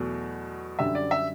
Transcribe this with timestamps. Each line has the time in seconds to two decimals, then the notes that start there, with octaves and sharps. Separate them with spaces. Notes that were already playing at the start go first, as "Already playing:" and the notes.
Already playing: E2 B2 F#3 A3
0.79 F#2 D3 G3 E5
0.95 D5
1.11 E5